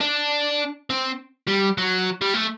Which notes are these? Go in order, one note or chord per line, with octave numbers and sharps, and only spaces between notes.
D4
C4
G3
F#3
G3
A3